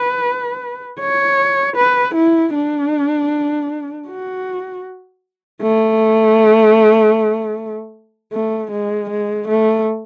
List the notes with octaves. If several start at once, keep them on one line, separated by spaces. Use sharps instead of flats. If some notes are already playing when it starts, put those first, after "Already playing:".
Already playing: B4
C#5
B4
E4
D4
F#4
A3
A3
G#3
G#3
A3